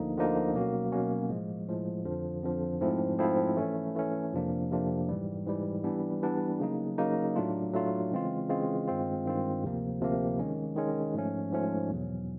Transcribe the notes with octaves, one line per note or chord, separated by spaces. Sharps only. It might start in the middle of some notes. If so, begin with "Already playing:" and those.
Already playing: D2 D3 F3 A#3 D#4
D2 D3 F3 A#3 D#4
B2 F#3 A#3 C#4 F#4
B2 F#3 A#3 C#4 F#4
A2 F3 G#3
A2 F3 G#3
F2 D3 F3
F2 D3 F3
G#2 F3 A3 C4 E4
G#2 F3 A3 C4 E4
E3 A3 C#4
E3 A3 C#4
F2 C3 F3 A#3 D4
F2 C3 F3 A#3 D4
G#2 E3 G3
G#2 E3 G3
E3 G3 B3 D4
E3 G3 B3 D4
C#3 F#3 A#3 D#4
C#3 F#3 A#3 D#4
A2 F#3 A3 D4 F4
A2 F#3 A3 D4 F4
C#3 E3 G#3 C4 F4
C#3 E3 G#3 C4 F4
G2 D#3 G#3 C4 F4
G2 D#3 G#3 C4 F4
D2 C3 F3 A#3
D2 C3 F3 A#3
D#3 G#3 C#4
D#3 G#3 C#4
G#2 F3 A3 C#4
G#2 F3 A3 C#4
E2 B2 F#3